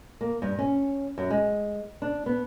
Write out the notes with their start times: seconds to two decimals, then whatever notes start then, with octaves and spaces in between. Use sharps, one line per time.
0.21 A#3
0.42 G2
0.59 C#4
1.18 F#2
1.30 G#3
2.02 D4
2.26 B3